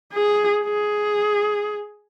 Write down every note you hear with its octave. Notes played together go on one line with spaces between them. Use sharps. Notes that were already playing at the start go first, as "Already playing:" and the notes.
G#4
G#4